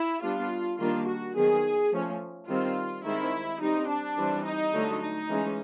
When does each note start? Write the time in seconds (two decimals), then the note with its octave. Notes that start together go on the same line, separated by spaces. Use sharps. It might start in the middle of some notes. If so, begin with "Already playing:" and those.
Already playing: E4
0.22 G3 B3 D4 F4
0.78 D#3 G3 A#3 D4 F4
1.07 F#4
1.35 D#3 F#3 B3 G#4
1.92 F3 A3 C#4
2.47 D#3 G3 C4 F4
3.04 D#3 G#3 C4 E4
3.60 G3 C4 D#4
3.89 D4
4.17 E3 G3 C4
4.45 D#4
4.73 D3 F#3 A3
5.01 D#4
5.29 E3 G#3 C#4